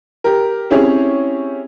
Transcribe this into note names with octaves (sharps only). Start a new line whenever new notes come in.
G4 A#4
C4 C#4 E4 G4 G#4 C#5